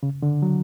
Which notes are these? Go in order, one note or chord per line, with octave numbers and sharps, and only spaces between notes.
C#3
D3
F#3